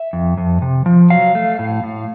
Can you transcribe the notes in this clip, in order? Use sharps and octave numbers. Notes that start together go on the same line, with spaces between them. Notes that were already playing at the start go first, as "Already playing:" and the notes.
Already playing: E5
F2
F2
C3
F3
F#3 F5
A3
A2
A2